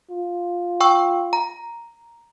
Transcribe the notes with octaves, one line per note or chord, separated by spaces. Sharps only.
F4
G5 C#6 E6
A#5